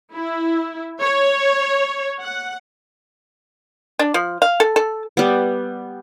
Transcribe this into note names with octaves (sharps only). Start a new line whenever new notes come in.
E4
C#5
F#5
D4
F3
F5
A4
A4
G3 B3